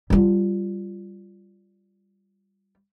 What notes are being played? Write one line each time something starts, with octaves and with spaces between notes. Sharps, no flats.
G3 F4